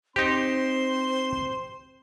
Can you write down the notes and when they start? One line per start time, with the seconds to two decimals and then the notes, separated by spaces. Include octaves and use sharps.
0.16 C4 D#4 G4 C5 C6